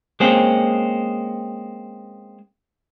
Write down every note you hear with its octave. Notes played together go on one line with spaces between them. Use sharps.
G#3 A#3 C4 C#4